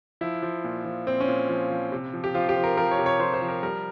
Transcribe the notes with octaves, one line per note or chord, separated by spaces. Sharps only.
F3 E4
F3
A#2
F3
A#2 C4
C#4
A#2
F3
F3
C3
F3
G4
F3 F4
G4
F3
A#4
F3 A#4
C#5
C3
C#5
F3 C5
C5
F3
A#4
G3 A#4